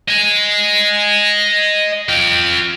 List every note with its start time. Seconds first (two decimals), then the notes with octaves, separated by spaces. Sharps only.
0.08 D#5 G#5
2.09 F4 G5